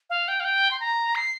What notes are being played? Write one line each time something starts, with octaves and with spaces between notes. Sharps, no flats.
F5
G5
F5
G5
C6
A#5
C7